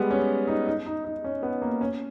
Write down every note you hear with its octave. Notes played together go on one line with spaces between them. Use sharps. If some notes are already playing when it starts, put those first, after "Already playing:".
Already playing: G3 G#3 B3
C#4
D#4
D#4
D#4
D#4
C#4
B3
A#3
C#4